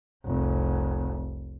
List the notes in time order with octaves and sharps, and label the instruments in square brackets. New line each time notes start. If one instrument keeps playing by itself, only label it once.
[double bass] F1 C2